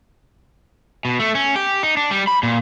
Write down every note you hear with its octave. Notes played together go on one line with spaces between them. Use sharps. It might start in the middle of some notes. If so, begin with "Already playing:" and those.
B2
A3
C#4
G4
D#4
D4
G3
B5
A#2